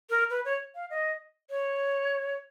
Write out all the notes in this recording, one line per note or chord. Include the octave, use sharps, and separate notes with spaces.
A#4
B4
C#5
F5
D#5
C#5